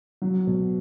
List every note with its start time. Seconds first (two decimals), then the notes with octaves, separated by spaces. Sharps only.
0.22 F#3
0.47 B2